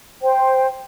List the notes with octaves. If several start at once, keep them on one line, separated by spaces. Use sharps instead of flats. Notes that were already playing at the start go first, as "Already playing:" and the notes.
C5 G5